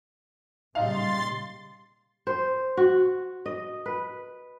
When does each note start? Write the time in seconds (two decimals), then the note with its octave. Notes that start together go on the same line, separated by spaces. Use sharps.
0.75 A#2 C#3 G3 D#4 F5 C6 A6
2.27 C5
2.77 F#4
3.46 D#5
3.86 B4